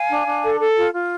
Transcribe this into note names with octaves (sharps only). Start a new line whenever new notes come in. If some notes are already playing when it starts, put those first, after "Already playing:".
Already playing: F5 G#5
D4
D4
A4
A4
F4
F4